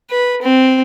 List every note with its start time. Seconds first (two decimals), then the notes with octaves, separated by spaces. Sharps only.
0.10 B4
0.42 C4